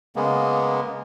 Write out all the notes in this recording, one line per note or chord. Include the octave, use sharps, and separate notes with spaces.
C#3 G#3 A#3 B3